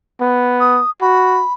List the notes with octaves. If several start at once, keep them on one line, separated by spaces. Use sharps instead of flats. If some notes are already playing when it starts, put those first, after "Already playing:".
B3
D#6
F#4 B5